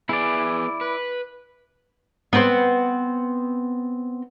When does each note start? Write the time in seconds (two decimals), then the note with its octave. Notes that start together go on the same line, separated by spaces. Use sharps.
0.09 B3 E4 G#4 D5
0.81 B4
2.33 B3 C4 C5